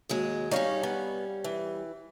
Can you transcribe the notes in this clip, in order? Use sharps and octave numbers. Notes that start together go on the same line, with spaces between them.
D#2 F#3 G#3
G3 C#4 D#4 C#5 F5
B3
E3